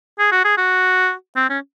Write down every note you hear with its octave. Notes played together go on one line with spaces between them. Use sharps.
G#4
F#4
G#4
F#4
C4
C#4